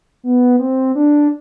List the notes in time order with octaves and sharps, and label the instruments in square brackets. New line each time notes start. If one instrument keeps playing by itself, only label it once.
[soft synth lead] B3
C4
D4